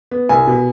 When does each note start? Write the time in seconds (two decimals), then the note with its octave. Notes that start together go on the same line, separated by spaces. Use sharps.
0.11 B3
0.29 C2 G#5
0.47 B2